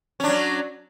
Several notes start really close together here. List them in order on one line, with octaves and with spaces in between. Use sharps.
C#4 D4 F#3